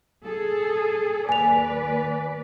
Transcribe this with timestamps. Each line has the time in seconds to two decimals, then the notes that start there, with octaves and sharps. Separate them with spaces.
0.24 G#4 A4
1.29 D#2 B4 D5 G#5 F7